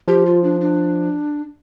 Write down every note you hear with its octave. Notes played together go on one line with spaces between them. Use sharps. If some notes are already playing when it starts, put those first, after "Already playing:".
F3 G4
F4
D4
D4